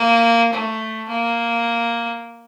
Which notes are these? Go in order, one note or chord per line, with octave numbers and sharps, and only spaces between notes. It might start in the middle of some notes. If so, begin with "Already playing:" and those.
Already playing: A#3
A3
A#3